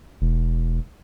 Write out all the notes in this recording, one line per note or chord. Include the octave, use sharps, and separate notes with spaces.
E1